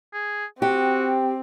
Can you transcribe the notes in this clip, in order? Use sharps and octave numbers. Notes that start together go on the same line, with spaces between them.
G#4
C4 F#4 G4